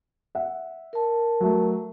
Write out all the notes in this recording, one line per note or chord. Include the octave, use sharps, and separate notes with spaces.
E5 F#5
A#4 A5
F#3 A3